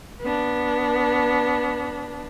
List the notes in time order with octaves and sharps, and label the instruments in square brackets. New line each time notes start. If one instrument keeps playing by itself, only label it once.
[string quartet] B3 D4